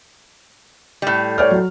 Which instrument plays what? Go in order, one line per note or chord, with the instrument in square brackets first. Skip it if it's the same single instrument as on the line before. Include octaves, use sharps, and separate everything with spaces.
[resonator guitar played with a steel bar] A2 G3
[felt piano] C#5 D5 F6
F#3